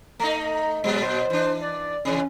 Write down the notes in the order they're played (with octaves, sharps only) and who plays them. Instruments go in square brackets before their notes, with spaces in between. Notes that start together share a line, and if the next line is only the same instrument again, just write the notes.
[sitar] A3 D#4 [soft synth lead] A#5
[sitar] A#2 F#3 [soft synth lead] G#3
[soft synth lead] C5
[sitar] E3 D4
[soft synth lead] D5
[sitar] C3 E3 [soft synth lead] C#4